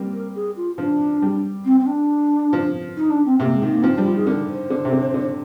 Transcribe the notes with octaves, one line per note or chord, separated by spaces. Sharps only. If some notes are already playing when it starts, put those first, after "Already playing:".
Already playing: G3 A#3 C4
A#4
G#4
F4
F3 D4
G3
C4
C4
D4
F3
D#4
D4
C4
C3 A#3
G#3
D#3
A#3
F3 C4
D4
G3
F4
D#3 G#4
D3 A#4
C5
D3
C3
D3
D3